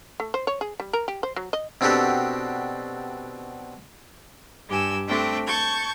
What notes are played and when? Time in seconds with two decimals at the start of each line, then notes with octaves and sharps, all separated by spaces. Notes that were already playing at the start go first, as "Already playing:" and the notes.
0.20 A3
0.34 C5
0.47 C#5
0.61 G#4
0.80 G3
0.93 A#4
1.08 G4
1.23 C5
1.36 F#3
1.53 D#5
1.81 B2 C4 D4 F#4 G4 A4
4.68 G2 G4 G#5 E6
5.07 A3 C4 D4 G5
5.46 A5 C#6 G6 G#6